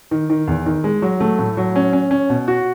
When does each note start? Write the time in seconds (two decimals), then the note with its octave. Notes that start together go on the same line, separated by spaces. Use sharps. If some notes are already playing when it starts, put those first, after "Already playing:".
0.11 D#3
0.30 D#3
0.48 E2
0.66 D#3
0.84 G#3
1.02 F#3
1.20 A3
1.39 A2
1.57 F#3
1.76 C#4
1.93 C#4
2.11 C#4
2.30 B2
2.48 F#4